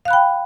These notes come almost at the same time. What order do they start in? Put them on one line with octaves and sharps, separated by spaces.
F5 F#6 B5 G5